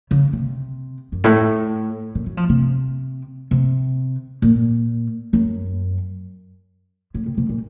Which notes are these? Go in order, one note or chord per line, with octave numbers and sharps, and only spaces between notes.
C#3
C3
F#2
A2
A#2
F#3
F3
C3
C3
A#2
F#2
A2
C3
C3
A#2